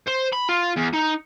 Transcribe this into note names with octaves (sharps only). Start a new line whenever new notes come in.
C5
B5
F4
E2
D#4